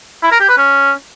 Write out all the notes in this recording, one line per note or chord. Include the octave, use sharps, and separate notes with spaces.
E4
A#4
G4
B4
C#4